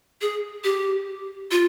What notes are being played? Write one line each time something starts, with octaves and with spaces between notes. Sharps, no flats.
G#4
G4
F4